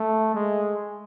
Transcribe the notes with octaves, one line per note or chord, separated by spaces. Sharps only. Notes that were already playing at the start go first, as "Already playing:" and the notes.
Already playing: A3
G#3